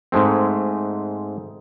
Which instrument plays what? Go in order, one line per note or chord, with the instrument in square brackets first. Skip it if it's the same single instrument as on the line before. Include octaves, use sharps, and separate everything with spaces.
[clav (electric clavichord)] G#2 G#3 A3 C4